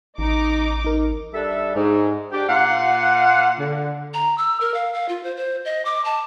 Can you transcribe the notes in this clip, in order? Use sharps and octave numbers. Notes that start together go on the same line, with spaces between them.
A1 D#4 D6
D#4 A#4
G3 D4 A4 E5
G#2
D4 G4
A#2 F4 F5 F#5
D3
A#5
E6
A#4
F5
F5
F4
C5
C5
D#5
D6
A5